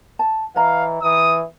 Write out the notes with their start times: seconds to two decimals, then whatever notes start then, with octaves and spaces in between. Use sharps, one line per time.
0.19 A5
0.56 E3 C#5 D#5 F5 A#5
1.02 E3 D#6